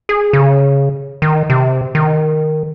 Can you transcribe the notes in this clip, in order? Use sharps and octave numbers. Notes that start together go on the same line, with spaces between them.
G#4
C#3
D#3
C3
D#3